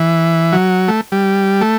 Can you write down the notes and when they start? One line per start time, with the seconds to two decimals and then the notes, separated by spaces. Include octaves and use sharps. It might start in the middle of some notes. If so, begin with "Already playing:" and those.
Already playing: E3
0.52 F#3
0.88 A3
1.12 G3
1.61 A3